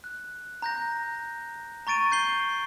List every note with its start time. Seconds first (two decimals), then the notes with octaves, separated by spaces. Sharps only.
0.04 F#6
0.62 A#5 G6 A#6
1.87 A#5 C#6 A6 D7 D#7
2.12 G6 C7 G7